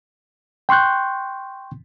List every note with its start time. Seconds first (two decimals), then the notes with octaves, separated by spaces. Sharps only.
0.69 G5 C6 C#6 F#6 G6